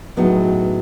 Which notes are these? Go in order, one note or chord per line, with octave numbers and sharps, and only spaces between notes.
A2 F#3 B3 D#4 G#4